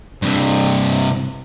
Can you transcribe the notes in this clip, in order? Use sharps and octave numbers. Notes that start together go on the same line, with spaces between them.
G2 C3